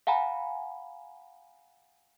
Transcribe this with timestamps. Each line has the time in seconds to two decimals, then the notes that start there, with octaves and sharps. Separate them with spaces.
0.07 F5 F#5 G#5 A#5 B5